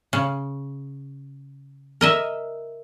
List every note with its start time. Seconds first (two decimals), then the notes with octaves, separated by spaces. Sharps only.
0.13 C#3
2.01 A#4 D#5 E5